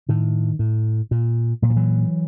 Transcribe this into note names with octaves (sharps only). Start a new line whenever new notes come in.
A2 D#3
A2
A#2
A#2 F#3
F3
E3 F#3